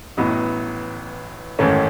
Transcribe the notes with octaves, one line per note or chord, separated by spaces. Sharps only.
A1 A2 F#3 B3 D#4
A1 G#2 D#3 A3 C#4